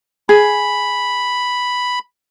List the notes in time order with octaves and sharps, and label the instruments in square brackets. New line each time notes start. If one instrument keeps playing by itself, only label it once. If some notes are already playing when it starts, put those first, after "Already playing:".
[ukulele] G#4 [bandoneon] B5